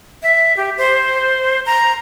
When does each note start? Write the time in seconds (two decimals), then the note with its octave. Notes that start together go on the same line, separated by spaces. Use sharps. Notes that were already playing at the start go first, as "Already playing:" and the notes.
0.23 E5
0.57 G4
0.78 C5
1.66 A#5